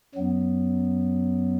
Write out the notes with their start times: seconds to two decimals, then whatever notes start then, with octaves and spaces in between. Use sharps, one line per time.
0.14 F#2 F#3 B3